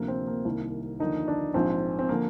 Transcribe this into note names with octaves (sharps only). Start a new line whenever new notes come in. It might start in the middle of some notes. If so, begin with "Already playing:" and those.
Already playing: D2 C3 F3 A#3
C4
A#3
C2 C3 D#3
D#2 D3 F3 D#4
D4
A#1 G#2 F3 C4
C4
D3 F3 A#3